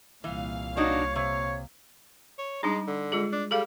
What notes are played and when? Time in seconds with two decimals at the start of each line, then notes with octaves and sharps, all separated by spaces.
0.24 C2 A#2 E3 F5
0.77 D4 D#4 F#4 C#5
1.15 C3 C#5
2.38 C#5
2.63 G3 G#3 D4 D#4
2.87 D3
3.12 G#3 F4 G#4
3.32 D4
3.51 G3 G#4 A4 F5